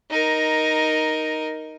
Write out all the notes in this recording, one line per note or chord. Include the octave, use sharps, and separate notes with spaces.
D#4 A#4